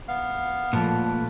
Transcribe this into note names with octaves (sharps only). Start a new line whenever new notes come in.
B3 F5
F2 A#2 F3 A3 B4